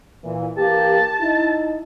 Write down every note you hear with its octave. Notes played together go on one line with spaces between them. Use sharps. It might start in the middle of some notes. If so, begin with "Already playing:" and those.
A#2 E3
E3 A#3 G4 A5
D#4 E4